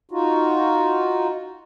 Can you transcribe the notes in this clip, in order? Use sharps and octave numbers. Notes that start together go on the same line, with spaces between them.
D#4 F4 F#4